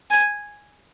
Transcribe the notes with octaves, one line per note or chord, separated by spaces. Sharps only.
G#5